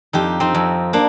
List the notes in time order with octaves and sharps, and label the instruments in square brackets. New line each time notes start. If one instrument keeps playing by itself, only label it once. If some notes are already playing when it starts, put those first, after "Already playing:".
[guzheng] F2 D#4 G4
C4 D#4
F2
A#3 D4